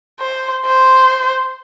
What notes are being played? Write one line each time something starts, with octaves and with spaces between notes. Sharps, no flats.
C5
C5